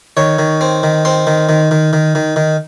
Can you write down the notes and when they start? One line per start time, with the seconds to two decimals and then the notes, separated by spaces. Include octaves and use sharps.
0.17 D#3 C#5
0.39 D#3
0.61 C4
0.83 D#3
1.05 C4 C6
1.27 D#3
1.49 D#3
1.71 D#3
1.93 D#3
2.15 D#3
2.36 D#3